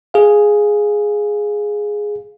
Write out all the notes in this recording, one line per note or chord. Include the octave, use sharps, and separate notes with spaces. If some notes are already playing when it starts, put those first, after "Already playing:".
G#4 F5